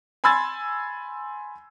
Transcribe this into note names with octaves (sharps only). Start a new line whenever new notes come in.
G#5 B5 C6 E6 G#6 A6